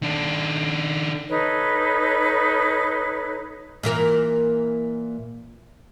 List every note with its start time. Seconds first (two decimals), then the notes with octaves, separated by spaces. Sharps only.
0.02 D#3 D4
1.28 D#4 A4 B4 C#5
3.83 A#2 E3 A#4